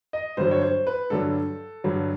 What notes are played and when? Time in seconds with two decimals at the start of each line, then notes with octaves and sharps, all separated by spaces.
0.13 D#5
0.37 G2 D3 F#3 C5
0.51 C#5
0.62 C5
0.87 B4
1.10 G2 D3 F#3 A4
1.84 G2 D3 F#3